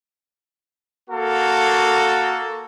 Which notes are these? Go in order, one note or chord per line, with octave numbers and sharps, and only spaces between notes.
A#3 F#4 A4